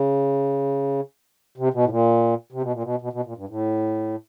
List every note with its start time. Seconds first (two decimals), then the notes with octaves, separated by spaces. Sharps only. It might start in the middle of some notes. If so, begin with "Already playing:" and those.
Already playing: C#3
1.58 C3
1.74 B2
1.85 A2
1.90 A#2
2.52 C3
2.62 B2
2.73 A#2
2.83 B2
3.01 B2
3.13 B2
3.25 A#2
3.37 G2
3.49 A2